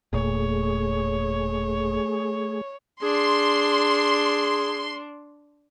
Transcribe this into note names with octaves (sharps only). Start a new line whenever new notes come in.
E1 A#2 A3 G#4 C#5
D4 G#4 C6